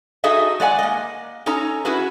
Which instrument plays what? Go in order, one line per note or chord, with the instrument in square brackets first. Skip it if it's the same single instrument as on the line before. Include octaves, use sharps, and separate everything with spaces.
[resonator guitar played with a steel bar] D#4 F#4 G#4 A4 D#5 E5
G#3 D5 F#5 G#5
A#3 D#5
C#4 D#4 A4 C#5 A#5
C#4 E4 F#4 G#4 B4